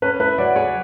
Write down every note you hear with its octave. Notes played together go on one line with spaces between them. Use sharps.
C#4 B4
E4 B4
F#3 D5
G#4 C#5